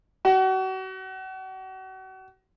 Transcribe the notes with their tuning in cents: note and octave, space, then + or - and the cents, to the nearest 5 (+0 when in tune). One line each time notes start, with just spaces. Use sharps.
F#4 +35